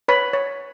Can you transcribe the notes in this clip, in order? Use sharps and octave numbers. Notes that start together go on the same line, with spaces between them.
B4 C#5 B5
C#5